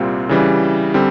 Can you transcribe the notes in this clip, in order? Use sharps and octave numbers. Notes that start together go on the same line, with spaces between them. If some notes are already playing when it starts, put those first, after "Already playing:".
Already playing: C2 A#2 G3 C4 F4
C#3 E3 G3
D3 G3 C4